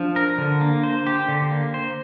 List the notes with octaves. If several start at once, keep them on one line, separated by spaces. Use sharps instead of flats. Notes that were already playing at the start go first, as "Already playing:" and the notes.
Already playing: F3 D4
A#4
D3
A#3
C5
G4
D3
A#3
C5